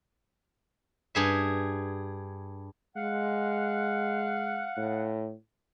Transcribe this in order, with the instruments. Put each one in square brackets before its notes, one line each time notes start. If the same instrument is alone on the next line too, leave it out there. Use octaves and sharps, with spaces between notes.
[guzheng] G2 G#4 E5
[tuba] G#3 [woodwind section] F5 F#5
[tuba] A2